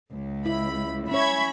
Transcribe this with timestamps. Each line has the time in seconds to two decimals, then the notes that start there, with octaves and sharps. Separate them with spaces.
0.12 C#2
0.46 E4 B5
1.11 C#4 C#5 E5 B5 C#6 G#6